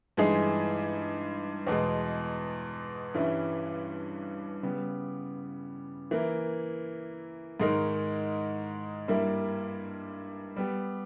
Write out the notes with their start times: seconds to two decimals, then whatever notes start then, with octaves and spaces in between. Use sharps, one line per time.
0.17 G2 E3 G#3 D#4 G#4
1.67 E2 B2 G#3
3.14 G2 E3 G3 C#4 E4
4.63 C#3 G3 B3
6.11 E3 A#3 E4 A#4
7.60 G#2 D#3 G#3 D#4 A#4
9.08 G2 G3 A#3 E4 A#4
10.56 G3 B3 G4